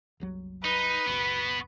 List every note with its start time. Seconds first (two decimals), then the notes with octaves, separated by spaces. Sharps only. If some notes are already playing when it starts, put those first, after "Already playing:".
0.20 F#1 C2 F#3
0.64 D#4 B4
1.07 F#1 C#2 B3 F#4